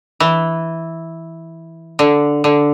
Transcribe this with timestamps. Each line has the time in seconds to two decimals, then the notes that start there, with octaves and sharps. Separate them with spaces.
0.20 E3
1.99 D3
2.44 D3